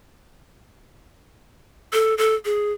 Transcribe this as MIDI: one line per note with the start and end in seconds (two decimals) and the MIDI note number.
1.93 2.16 69
2.18 2.35 69
2.45 2.72 68